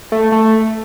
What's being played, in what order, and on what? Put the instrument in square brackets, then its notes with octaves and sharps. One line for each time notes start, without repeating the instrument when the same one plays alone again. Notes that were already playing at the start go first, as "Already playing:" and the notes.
[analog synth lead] A3
A3